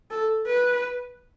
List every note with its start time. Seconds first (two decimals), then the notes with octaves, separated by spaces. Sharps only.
0.11 A4
0.47 B4